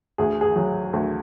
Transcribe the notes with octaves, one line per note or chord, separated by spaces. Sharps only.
D2 G#4
G#4
F#3
D2